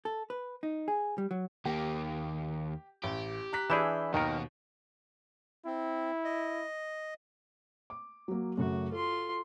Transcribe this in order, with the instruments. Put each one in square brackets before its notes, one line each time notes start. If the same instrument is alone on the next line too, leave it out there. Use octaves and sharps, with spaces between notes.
[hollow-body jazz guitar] A4
B4
D#4
G#4
G3
F#3
[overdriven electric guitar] D#2 A#3 [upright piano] G4
[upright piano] A1 [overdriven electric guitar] G4
[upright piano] A#5 F#6 B6
[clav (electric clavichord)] E3 E4 G#4 [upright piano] D4 G6 E7
[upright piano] D#2 [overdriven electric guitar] B2 [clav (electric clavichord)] D#3 A#4
[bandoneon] C4 [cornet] E4
[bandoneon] D#5
[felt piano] D6
F#3 A#3
[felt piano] F#2 C#3 A3 [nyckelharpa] F#4
[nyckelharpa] F4 C6 [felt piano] A4